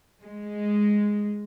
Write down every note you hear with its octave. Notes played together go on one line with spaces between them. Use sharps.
G#3